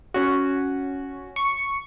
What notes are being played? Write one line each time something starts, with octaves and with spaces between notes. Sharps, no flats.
C#4 F#4
C#6